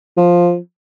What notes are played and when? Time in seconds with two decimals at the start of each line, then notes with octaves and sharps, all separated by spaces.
0.17 F3